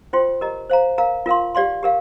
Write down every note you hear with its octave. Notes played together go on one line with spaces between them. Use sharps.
F4 C5 G5 C6
G4 A#4 D#5 A#5
C5 F5 A#5
A#4 F5 A#5
F4 A#4 F5 C6
G4 D5 F5 C6
G4 A#4 F5